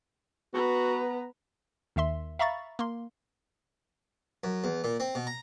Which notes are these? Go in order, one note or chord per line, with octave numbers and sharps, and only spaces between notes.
B3 F#4 B4 A#5
D#2 D#3 E5 C6
E5 F5 A#5 B5 C#6 A6
A#3 C6
F#2
E2
A#2
C4
B2
A#5